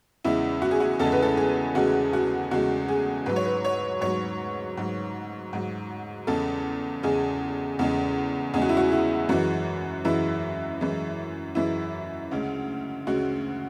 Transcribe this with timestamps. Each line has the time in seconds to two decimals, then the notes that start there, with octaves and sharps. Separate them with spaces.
0.24 E2 C#3 G#3 E4
0.62 F#4
0.71 G#4
0.80 F#4
0.99 E2 C#3 G#3 A4
1.12 B4
1.22 A4
1.37 G#4
1.75 E2 C#3 G#3 F#4
2.13 F#4
2.51 E2 C#3 G#3 F#4
2.88 G#4
3.26 G#2 F#3 B4
3.36 C#5
3.45 B4
3.64 C#5
4.01 G#2 F#3 C#5
4.77 G#2 F#3
5.53 G#2 F#3
6.27 E2 C#3 G#3 A4
7.03 E2 C#3 G#3 G#4
7.79 E2 C#3 G#3
8.54 E2 C#3 G#3 G#4
8.62 F#4
8.69 E4
8.77 F#4
8.92 E4
9.29 F#2 E3 G#3 F#4
10.05 F#2 E3 G#3 E4
10.80 F#2 E3 G#3
11.55 F#2 E3 G#3 E4
12.31 D2 C#3 G#3
13.07 D2 C#3 G#3 F#4